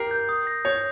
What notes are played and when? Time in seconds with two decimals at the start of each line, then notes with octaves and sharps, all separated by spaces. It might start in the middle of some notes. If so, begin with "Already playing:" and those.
Already playing: G4 A#4 C7
0.11 G6
0.29 D#6
0.47 A#6
0.65 C#5 G6